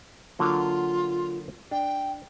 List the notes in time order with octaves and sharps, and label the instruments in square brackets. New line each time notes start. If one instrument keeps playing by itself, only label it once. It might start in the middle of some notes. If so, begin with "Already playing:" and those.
[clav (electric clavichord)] D3 F#3 A#3 [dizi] F4
[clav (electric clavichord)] D4 [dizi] G5